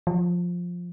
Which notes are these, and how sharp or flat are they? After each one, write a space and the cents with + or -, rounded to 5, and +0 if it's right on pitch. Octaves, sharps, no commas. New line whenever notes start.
F3 +10